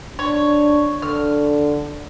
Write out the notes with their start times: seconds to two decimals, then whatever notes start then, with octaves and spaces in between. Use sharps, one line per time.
0.19 D4 C#5
1.02 D3 F6